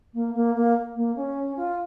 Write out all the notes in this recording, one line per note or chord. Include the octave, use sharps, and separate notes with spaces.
A#3
A#3
A#3
A#3
C#4
F4